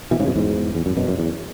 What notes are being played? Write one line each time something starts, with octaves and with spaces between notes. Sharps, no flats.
B2 E3
G#2 C#3
F#2 B2
E2 G#2
E2
F#2
F#2 B2
F#2
E2